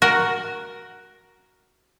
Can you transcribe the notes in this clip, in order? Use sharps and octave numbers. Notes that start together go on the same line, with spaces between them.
F#4 A#4